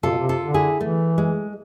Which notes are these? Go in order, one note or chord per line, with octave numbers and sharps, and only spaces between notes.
C3 F4 A4
B2
C3
F4 A4
D3
E4 G#4
E3 A3
G#3